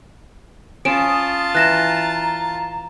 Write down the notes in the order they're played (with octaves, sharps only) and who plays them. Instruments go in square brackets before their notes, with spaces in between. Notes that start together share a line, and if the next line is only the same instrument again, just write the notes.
[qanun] C#4 [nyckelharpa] F4 A5 [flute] D#6 [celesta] D7 E7
[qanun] E3 [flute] A#5 [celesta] F#6 A#6 E7